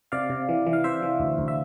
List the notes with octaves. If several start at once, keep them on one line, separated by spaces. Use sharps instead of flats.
C3 D5 F5
C3
E3
E3
F5
C3 C5 E5
E3
D2
D2
E5